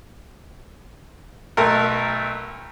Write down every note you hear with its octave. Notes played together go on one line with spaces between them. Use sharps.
B1 A3 A#4